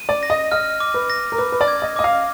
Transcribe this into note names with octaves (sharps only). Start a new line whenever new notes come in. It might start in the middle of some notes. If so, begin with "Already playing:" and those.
Already playing: D#7
D5
A#6
D#5
D#5 F6
D6
B4
A#6
A#4
B4 D6
B4
D5
G#6
D#5
D#5 D6
F5